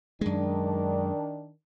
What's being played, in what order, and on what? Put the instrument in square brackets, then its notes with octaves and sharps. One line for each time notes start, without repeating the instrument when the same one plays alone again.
[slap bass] F#2 G#3 [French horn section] D#3 D4